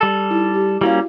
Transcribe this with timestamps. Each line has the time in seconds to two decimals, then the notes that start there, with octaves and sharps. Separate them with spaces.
0.01 G3 A4
0.30 D#4 E4
0.54 G4
0.81 G3 A#3 C#4 E4 F#4 F5